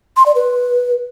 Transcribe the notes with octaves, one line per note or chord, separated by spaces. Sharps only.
C6
D5
B4